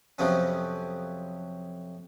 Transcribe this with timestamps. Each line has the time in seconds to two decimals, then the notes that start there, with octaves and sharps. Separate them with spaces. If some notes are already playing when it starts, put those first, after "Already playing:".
0.18 F2 C3 F3 F#3 B3 C#4